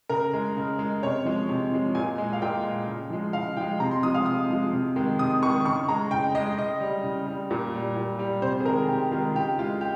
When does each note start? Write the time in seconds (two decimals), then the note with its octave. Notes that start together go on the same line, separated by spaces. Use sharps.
0.09 C#3 A#4
0.33 G#3
0.57 C#3
0.79 G#3
1.03 C3 C#5
1.25 F3 G#3
1.49 C3
1.72 F3 G#3
1.95 A#2 G#5
2.18 G#3
2.33 F5
2.42 A#2 G5
2.65 G#3
2.87 C#3
3.10 F3 G#3
3.33 C#3 F5
3.57 F3 G#3 G5
3.80 C3 A#5
3.91 C6
4.03 F3 G#3 D#6
4.14 F5
4.26 C3 D#6
4.50 F3 G#3
4.73 C3
4.96 D#3 G#3
5.19 C3 D#6
5.43 G#3 C#6
5.45 D#3
5.65 C#3 C#6
5.88 G#3 A#5
6.11 C#3 G5
6.35 G#3 D#5
6.58 C#3 D#5
6.80 G3
7.03 C#3
7.27 G3
7.51 A#2
7.74 G3
7.96 A#2
8.19 G3
8.42 C3 C5
8.60 G#4
8.65 D#3 G#3 A#4
8.88 C3 G4
9.12 D#3 G#3 F4
9.35 C#3 G4
9.59 G#3 F4
9.81 G4